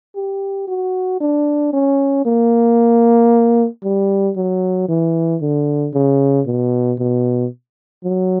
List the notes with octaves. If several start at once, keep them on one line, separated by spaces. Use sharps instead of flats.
G4
F#4
D4
C#4
A#3
G3
F#3
E3
D3
C#3
B2
B2
F#3